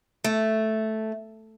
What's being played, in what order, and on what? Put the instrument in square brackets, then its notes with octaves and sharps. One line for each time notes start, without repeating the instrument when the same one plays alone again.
[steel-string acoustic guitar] A3